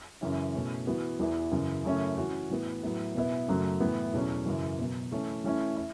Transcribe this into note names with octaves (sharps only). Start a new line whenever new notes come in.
F#2 C#3 E3 C#4 E4
B2 A3 C#4 E4
E3 B3 F#4
E2 E3 B3 E4
F#2 C#3 E3
F#2 C#3 A3 C#4 E4
E3 C#4 F#4
A2 E3 B3
A2 F#3 B3 E4
B2 B3 E4
F#2 C#3 F#3 A3
A2 E3 B3 E4
E2 B2 F#3 A3 C#4
F#2 C#3 E3
B2 F#3 B3
E3 A3 C#4
E3 A3 C#4 E4
E4